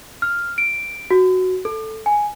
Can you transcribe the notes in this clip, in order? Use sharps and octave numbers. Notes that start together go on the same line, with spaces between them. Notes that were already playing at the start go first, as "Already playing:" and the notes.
F6
D7
F#4
A4
G#5